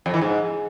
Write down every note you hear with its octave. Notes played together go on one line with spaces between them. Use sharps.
F2
E3
G#2